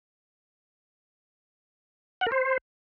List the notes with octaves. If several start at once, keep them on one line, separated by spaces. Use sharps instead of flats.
F#5
A#4
C5